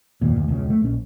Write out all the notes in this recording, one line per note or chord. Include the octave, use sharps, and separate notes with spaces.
F#1 D#2 A#2
D2
E1 C#2 C#3
A3
A#1 C#4